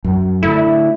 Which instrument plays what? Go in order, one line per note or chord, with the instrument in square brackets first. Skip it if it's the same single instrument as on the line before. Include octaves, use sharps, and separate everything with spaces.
[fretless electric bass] F#2
[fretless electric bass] D3 A3 [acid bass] E4